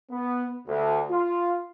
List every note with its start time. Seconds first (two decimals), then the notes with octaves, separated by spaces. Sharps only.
0.11 B3
0.67 D2
1.11 F4